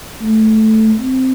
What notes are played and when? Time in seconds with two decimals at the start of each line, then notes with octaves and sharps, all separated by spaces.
0.21 A3
1.00 C4